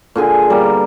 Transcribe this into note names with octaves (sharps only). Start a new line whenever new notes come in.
A#2 D3 G#4 G#5
B2 G3 A#3